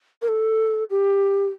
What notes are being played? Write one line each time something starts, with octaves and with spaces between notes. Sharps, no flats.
A#4
A4
G4